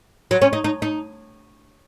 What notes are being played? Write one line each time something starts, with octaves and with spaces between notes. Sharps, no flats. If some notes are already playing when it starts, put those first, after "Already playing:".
F#3
C#4
D#4
D#4
D#4